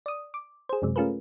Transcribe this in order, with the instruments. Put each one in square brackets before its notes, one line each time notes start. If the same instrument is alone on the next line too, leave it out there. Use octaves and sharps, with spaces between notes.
[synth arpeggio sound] D5 D#6
D6
G#4 C5
F#2 C3 F#3 G#3
A3 C#4 F4 G#4 A#4 B4